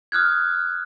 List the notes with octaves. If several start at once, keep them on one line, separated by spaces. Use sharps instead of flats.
D#6 F6 F#6 G#6